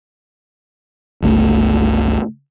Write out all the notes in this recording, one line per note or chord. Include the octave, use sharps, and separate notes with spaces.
G1 C#2 A3